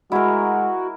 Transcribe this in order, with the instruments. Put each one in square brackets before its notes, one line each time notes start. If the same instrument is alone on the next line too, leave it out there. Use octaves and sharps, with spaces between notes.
[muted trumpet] G#3 [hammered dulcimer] E4 A#4 [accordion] F#4